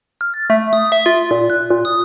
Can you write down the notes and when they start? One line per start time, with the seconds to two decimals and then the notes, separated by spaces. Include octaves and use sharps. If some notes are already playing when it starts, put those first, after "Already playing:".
0.21 F6
0.34 A6
0.50 A3
0.73 D#6
0.92 E5
1.06 F4
1.31 A#2
1.50 F#6
1.70 A#2
1.85 D#6